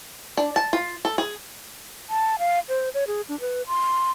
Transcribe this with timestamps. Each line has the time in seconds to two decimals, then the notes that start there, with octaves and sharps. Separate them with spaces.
0.37 D4
0.56 A5
0.73 F4
1.05 A4
1.18 G#4
2.10 A5
2.39 F5
2.69 C5
2.94 C#5
3.07 G#4
3.29 D4
3.40 B4
3.67 C6